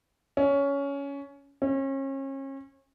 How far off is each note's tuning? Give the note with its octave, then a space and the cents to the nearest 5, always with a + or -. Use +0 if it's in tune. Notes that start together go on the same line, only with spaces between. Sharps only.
C#4 +15
C#4 -35